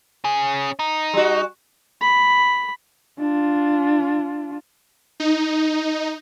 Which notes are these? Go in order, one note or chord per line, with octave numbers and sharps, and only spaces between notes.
C#4 G#4
D#4
G3 F#4
B5
D4 F4
D#4